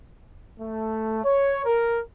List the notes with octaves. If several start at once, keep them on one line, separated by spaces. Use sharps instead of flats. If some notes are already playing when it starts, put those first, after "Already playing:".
A3
C#5
A#4